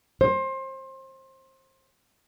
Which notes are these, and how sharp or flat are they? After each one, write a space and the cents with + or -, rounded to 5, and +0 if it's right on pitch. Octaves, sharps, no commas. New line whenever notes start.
C5 +25